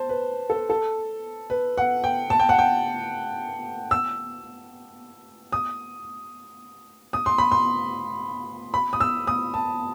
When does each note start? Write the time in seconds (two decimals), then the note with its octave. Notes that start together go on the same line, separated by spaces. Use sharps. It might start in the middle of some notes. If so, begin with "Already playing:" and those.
Already playing: C5 A5
0.09 B4
0.50 A4
0.70 A4
1.50 B4
1.78 F#5
2.04 G5
2.30 A5
2.39 G5
2.49 F#5
2.59 G5
3.91 E6
5.52 D#6
7.13 D#6
7.26 C6
7.38 B5
7.52 C6
8.74 B5
8.93 D#6
9.00 E6
9.27 D#6
9.54 A5